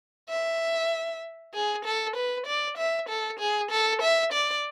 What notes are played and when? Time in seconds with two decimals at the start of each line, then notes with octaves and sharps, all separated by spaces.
0.29 E5
1.54 G#4
1.85 A4
2.16 B4
2.46 D5
2.77 E5
3.09 A4
3.39 G#4
3.71 A4
4.02 E5
4.33 D5